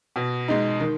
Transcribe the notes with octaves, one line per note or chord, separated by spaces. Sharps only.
B2
G#3 D#4
D#3